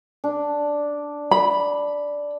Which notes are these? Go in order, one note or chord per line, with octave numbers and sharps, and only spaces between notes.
D4
B5